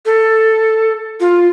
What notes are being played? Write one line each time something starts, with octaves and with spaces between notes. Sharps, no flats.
A4
F4